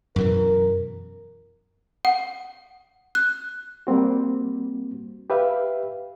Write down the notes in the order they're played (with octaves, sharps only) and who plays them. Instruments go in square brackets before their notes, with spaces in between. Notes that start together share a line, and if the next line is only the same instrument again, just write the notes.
[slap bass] F#2 B2 E3 [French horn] A#4
[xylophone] F#5
F#6
[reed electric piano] G3 A#3 C4 F#4
G4 B4 E5 F5